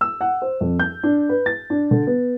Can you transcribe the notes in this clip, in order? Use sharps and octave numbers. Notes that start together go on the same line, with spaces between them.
E6
F#5
C5
F2
G6
D4
B4
A6
D4
D3
B3